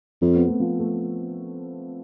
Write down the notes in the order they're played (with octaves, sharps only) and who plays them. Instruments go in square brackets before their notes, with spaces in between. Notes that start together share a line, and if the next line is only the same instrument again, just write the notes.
[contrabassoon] F2 [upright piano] C4
[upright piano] B3
A3
F3
A3